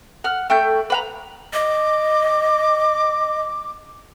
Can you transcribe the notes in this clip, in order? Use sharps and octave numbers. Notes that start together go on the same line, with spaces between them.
F#5 F6
A3 G5 C#6 G6
B4 F#5 A#5
D#5 D6